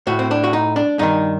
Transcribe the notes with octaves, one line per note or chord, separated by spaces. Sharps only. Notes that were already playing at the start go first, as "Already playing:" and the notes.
A2 F#4
C4
D4
F#4
D#4
D4
G2 D#3 D#4